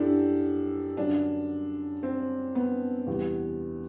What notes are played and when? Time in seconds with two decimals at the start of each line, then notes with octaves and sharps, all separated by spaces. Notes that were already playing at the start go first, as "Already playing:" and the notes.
Already playing: F#2 D4 E4 G4 A4
0.97 F#2 D3 F#3 D4
2.03 C4
2.55 B3
3.07 E2 C3 G3